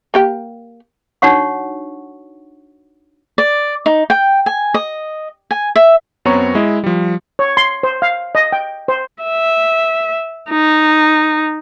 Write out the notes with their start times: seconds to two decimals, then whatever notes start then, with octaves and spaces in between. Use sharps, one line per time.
0.14 A#3 G4 G5
1.22 D4 D#4 F#4 C#5 F#5 C#6
3.38 D5
3.86 D#4
4.10 G5
4.46 G#5
4.74 D#5
5.51 G#5
5.76 E5
6.25 F#2 B3 C4 C#5 A#5 C#6
6.55 G#3 E4 D#5
6.84 F3 G3
7.39 C#5
7.57 C6
7.83 C5
8.02 F5
8.35 D#5
8.52 G5
8.88 C5
9.23 E5
10.50 D#4